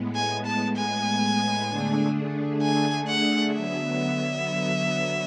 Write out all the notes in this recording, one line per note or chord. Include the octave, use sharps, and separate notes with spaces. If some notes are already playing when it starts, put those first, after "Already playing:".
Already playing: A2 G#3 B3
G#5
A5
G#5
D3 A3 D4 G#4
G#5
F#5
D3 F#3 B3 E5